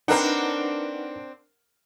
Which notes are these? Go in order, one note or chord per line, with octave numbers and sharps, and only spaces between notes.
C4 D4 D#4 A#4 B4 F#5